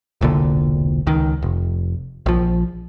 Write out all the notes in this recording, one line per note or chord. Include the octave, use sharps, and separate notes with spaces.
E1 C2 A#2 D3
C#2 D#3
F1
A#1 F3